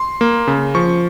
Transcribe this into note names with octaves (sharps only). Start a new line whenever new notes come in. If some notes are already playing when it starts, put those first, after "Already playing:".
Already playing: C6
A#3
C#3
F3 C#6